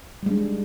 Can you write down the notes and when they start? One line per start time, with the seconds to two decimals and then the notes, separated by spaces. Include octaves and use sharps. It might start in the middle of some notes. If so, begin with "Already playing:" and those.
0.23 G3
0.26 G#3
0.30 D4